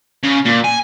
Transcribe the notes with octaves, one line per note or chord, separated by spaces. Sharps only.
C#3
A#2
G#5